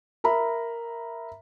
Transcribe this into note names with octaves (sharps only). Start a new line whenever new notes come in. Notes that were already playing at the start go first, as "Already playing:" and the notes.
A#4 E5 A#5 B5